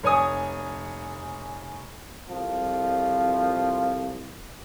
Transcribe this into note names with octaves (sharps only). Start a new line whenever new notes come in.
F1 C#5 G#5 D#6
C2 F2 F3